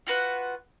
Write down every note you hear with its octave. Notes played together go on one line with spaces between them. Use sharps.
F4 F#4 B4 F#5